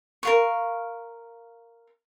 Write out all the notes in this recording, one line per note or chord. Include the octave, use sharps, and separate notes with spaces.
A#4 F5 C#6